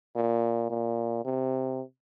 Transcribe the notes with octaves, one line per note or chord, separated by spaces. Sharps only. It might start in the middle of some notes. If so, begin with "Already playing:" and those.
A#2
A#2
C3